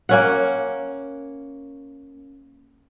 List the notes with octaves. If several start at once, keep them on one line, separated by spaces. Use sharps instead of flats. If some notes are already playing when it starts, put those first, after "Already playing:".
A#3 C#4 F#5